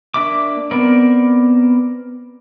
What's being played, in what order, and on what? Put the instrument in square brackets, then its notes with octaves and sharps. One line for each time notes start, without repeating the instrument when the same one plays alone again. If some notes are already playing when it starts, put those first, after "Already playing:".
[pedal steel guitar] A#3 D4 E5 D6
B3 C4 A#4 D5